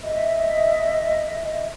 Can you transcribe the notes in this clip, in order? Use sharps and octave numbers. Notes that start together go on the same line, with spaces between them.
D#5 E5